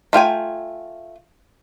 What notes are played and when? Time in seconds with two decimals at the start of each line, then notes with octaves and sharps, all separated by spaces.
0.13 A3 F4 G5 G#5